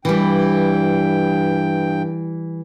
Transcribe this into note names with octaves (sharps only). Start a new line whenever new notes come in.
G2 E3 G3 G5